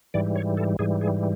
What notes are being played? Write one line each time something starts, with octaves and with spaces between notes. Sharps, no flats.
G#2 E3 G3 D5
C#5
A4
G#2 E3 G3 G#4
G#4